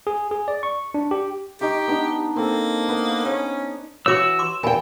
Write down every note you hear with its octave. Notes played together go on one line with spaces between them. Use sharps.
G#4
G#4
D5
C#6
D4
G4
D#4 G4 C#6 D6
B3 D4 D#4
A#3 C4 A4
B3
C#4
E3 F#4 C#5 D6 E6
C6 D6
E2 A#4 G5 G#5 B5